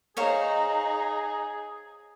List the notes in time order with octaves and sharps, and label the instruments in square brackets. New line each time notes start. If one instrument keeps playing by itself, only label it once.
[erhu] D#4 [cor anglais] G#4 [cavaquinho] C5 C#5 F5